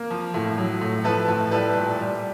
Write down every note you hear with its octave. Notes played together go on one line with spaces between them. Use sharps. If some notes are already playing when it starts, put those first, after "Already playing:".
Already playing: A#3
F3
A2
F#3
A2
F3 A4 B4
A2
G3 A4 B4
A#2
G3